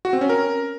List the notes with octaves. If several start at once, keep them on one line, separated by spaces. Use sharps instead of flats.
F#4
C4
C#4
A#4